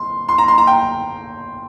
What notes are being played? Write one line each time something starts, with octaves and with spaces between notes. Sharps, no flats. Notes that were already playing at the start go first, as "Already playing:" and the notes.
Already playing: C6
C6
A#5
C6
A#5
G5